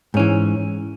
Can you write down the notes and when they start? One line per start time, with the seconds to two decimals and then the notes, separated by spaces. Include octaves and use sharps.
0.14 G#2
0.17 C#4
0.19 E3